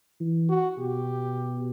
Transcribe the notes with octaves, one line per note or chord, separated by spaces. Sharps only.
E3
F#4
B2 G4